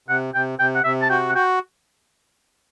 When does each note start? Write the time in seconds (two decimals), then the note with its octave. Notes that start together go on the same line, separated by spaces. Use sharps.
0.08 C3 F#5
0.34 C3 G5
0.59 C3 G5
0.75 F#5
0.84 C3 E5
1.02 A5
1.10 F#4 G5
1.29 F#5
1.35 F#4 G5